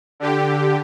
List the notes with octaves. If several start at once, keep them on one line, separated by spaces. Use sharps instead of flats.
D3 G4